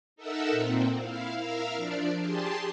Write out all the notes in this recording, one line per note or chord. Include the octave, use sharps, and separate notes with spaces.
D#4 A4 A#4 E5 F#5 E6
A#2 C4
E4 F5
A#4 E5 F5 F6
F3 D4 D5
G4 G#4 A5 C6